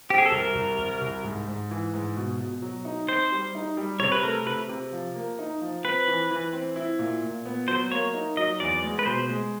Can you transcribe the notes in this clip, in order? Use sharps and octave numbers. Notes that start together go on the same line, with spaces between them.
C4 G4
G#4
A4
C2 A#4
C2
C2
C2
G#2
G#2
E3
G#2
B2
B2
F#3
D#4
C4 C5
G3
D#4
G3
C3 C#5
B4
A3 A#4
C3 B4
C3
F3
A#3
D#4
F3
C4 B4
E3
E3
C4
E4
A#2
A#2
B3
F#3 C5
A#3 C#5
D#4
F#3 D#5
E2 D5
G#3
B4
B2 C5
G#3